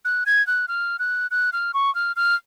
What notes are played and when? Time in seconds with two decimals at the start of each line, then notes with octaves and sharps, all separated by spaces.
0.05 F#6
0.26 G#6
0.47 F#6
0.68 F6
0.99 F#6
1.31 F#6
1.53 F6
1.74 C#6
1.95 F6
2.16 F6